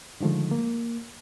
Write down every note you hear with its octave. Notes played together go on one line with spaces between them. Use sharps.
D3 D#3 F3 G#3 A3
A#3